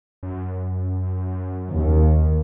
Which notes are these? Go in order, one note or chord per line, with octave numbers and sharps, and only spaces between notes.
F#2
D#2